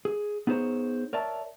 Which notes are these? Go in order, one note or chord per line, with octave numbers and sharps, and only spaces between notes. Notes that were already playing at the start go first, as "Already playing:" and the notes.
G#4
B3 D#4 G#4 A4 C5 C#5
A#4 C#5 D5 E5 A5